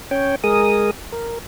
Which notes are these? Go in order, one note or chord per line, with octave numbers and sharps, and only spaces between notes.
C#4 C#5 G5
G#3 G#4 A#4 D#6
A#4